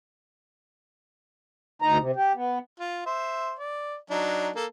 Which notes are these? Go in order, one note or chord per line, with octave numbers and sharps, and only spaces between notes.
D2 D#4 A#5
C3
G4
B3
F4
C5 E5
D5
F#3 D4 D#4
A#3 A4